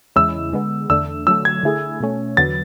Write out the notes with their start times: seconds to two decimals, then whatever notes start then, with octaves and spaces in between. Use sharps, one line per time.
0.16 E2 C#3 G#3 C#4 E4 E6
0.53 D3 G#3 B3
0.90 E2 D3 A3 D4 E6
1.27 D3 F#3 A3 E6
1.45 G#6
1.63 D3 A3 E4 G#4
2.00 B2 A3 C#4
2.37 E2 D3 F#3 B3 A6